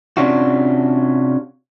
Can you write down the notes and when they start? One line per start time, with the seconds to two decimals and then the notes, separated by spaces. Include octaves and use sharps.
0.17 C3 C#4 D4 F4 F#4